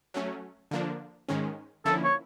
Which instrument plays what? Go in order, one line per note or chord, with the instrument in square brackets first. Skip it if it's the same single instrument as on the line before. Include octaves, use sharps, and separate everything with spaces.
[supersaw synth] F#3 A3 C#4
D3 F3 A#3 D4
G#2 D#3 G#3 C#4
[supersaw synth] D3 F3 A#3 C#4 E4 [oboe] A4
[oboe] C#5